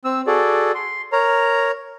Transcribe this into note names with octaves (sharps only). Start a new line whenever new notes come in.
C4 E6
F#4 G#4 A4 D5
C6
A#4 C#5 A#5